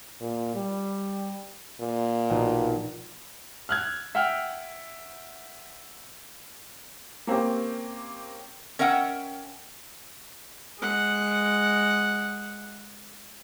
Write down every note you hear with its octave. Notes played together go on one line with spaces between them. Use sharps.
A#2
G3
A#2
A#1 B2 D#4
F6 F#6 G#6
E5 F#5 G5 F6
A#3 C4 C#4 G4
C#4 A#4 E5 F#5 G5
G#3 F#5